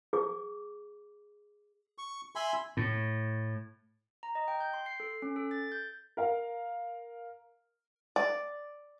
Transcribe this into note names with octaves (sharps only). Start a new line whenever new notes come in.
G#4 D6
C#6
E5 G#5 B5 C6
A2
A#5
D#5
G5
G6
C6
C7
A4
C#4
A4
A6
G6
A#4 F5
D5